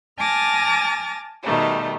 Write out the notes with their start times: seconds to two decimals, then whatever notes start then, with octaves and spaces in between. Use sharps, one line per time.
0.17 G#5 A5 D6 F6 A6 A#6
1.42 B2 D#3 G3 A3